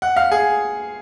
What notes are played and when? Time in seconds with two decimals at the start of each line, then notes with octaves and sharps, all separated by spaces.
0.02 F#5
0.17 F5
0.31 G#4